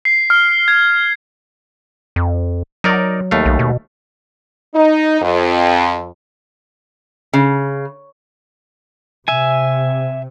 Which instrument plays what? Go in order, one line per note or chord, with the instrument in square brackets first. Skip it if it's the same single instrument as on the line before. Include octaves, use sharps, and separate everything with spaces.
[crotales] C7
F6
G#6
[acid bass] F2
[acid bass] F#3 [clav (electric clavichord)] D#4 A#4 D5
[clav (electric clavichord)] D#2 A3 F5
[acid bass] B1
B2
[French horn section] D#4
F2
[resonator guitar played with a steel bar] C#3
[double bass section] C3 [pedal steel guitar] E5 G#5